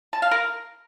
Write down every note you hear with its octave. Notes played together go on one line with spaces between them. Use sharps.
A5
F5
A#4